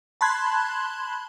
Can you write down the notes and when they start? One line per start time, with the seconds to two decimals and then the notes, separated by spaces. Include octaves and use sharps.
0.21 A5 B5 C6 F#6 G#6